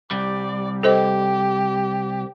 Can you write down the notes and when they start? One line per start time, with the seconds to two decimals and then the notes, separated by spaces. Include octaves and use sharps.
0.11 C2 G3 D5
0.83 G4 A4 C5 D#5